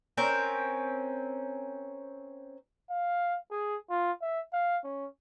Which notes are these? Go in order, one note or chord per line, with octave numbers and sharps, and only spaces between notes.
C4 C#4 A#4
F5
G#4
F4
E5
F5
C#4